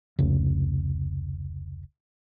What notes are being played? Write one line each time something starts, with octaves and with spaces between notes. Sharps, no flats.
F1 C#2